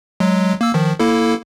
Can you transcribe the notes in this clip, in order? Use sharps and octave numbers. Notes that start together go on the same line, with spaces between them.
F#3 G#3
A#3 E6
D#3 F3
A#3 E4 A4